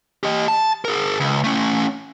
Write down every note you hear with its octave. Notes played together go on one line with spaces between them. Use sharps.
G4 D#5
A5
G#4 A#4
C#2
A3 C#4